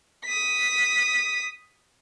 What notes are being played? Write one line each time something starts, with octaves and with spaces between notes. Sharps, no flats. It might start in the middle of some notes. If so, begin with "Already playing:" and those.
D#6 B6